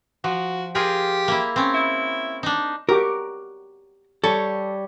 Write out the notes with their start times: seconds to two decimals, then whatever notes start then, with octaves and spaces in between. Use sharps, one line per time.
0.24 F3 F#4
0.75 F4 G4 G#4 A#4
1.28 A#3 E4
1.56 C4 C#4
1.74 E4
2.43 D4 D#4
2.89 F#4 G4 A#4 D6
4.24 G3 A4 C#5 C#6